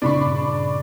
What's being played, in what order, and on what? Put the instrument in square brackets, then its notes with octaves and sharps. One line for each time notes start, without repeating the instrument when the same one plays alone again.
[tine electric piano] G2 A#2 C#3 [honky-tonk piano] D4 B5 C#6